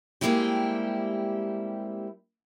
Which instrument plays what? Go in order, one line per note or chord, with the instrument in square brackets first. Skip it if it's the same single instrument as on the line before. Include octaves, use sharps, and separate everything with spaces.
[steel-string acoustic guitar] G3 G#3 A#3 C4 E4 G4